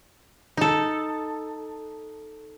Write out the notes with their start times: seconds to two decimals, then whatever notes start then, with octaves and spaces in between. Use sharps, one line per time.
0.57 D#4 A4